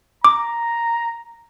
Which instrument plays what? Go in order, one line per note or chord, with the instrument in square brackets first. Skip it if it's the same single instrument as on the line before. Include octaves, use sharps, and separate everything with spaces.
[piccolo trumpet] A#5 [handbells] D6